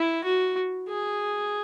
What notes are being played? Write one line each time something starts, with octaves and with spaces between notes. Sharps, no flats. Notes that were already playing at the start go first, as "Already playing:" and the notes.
Already playing: E4
F#4
G#4